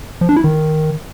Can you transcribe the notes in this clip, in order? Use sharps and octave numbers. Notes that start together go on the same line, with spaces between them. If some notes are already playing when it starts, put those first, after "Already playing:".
F3
D4
E4
D#3